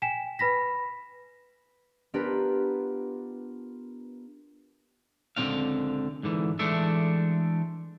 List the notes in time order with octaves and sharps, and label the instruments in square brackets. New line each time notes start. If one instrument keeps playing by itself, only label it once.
[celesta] G5 G#5 B6 E7
B4 B5 A#6 B6
[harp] B3 D4 F4 G4 A#4 B4
[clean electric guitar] C#2 D3 D#3 C4 D4 F5
G#2 D3 E3
E3 G#3 A3 D4 A4 E5